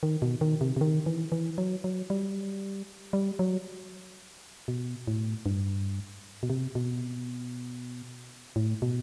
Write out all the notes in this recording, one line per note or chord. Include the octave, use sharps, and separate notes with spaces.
D#3
B2
D#3
C3
C3
D#3
E3
E3
F#3
F#3
G3
G3
F#3
B2
A2
G2
B2
C3
B2
A2
B2